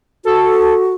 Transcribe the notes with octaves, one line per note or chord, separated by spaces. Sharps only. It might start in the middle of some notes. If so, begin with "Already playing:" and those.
F#4 A4